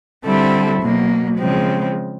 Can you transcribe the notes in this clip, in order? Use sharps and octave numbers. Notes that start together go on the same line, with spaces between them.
D3 G3 C4 E4 A4
B2 F#3 A#3
C#3 F3 G#3 C4